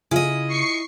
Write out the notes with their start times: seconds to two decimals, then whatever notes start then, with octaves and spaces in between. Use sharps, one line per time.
0.11 C#3 E4 F4 G#4 D#5
0.47 C#6 C7 C#7